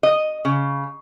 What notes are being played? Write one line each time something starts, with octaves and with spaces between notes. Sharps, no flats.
D#5
C#3